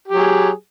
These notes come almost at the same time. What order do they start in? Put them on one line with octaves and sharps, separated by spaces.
G4 F#3 G#4